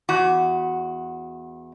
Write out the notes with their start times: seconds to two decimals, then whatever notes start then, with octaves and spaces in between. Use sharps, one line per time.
0.09 E2 F#4